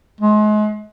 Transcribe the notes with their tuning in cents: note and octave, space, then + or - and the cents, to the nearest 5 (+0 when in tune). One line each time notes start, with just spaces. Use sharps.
G#3 +35